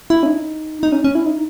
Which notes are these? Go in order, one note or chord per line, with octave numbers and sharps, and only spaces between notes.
E4
C#4
D#4
D#4
C#4
C#4
E4
D#4